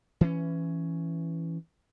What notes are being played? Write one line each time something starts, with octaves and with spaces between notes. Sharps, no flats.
E3 C#4